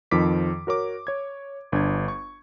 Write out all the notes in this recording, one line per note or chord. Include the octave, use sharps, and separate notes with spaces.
F2 D#3 F3 D6 B6
F#4 A#4 C#5 D6
C#5 G#6
G1 D4 G#6
C#6